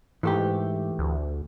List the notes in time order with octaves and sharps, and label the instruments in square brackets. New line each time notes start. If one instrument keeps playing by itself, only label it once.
[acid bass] G#2 [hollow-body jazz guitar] E3 A3 G4
[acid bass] D2